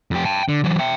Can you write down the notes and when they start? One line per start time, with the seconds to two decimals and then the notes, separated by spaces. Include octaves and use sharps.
0.11 F2 G4
0.25 G5 A5
0.49 D3
0.64 E3 F#3
0.79 E5 G5